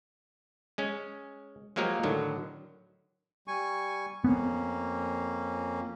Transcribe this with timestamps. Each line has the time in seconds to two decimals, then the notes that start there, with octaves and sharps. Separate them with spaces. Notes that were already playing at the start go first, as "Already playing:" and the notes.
0.78 G#3 C#4
1.76 F3 F#3 G#3 A#3 G4 A#4
2.03 A2 D3 D#3 F#3
3.48 G3 G#5 C#6
4.24 F2 A#3 B3 C#4